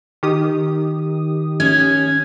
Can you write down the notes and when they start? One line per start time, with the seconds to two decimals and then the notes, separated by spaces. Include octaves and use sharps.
0.23 D#3 G4 D#6
1.60 C#4 G#6